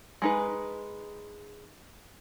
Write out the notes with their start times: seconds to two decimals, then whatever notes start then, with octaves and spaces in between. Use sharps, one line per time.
0.22 G#3 D#4 B4